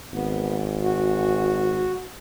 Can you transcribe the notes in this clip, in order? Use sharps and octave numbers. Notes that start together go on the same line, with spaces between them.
G#1 B3
F#4